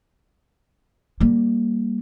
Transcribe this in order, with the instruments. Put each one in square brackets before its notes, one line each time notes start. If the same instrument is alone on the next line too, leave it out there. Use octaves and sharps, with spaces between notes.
[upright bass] G3 A#3